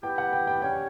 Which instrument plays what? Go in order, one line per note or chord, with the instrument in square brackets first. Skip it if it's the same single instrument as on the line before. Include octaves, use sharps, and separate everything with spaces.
[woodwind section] B3 E4 G4 [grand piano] G5
[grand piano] F#5
G5
G5
[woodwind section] G3 C#4 G4 C#5 [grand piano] G5